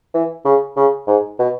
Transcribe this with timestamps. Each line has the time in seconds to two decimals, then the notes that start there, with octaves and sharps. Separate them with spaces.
0.14 E3
0.45 C#3
0.76 C#3
1.07 G#2
1.39 B2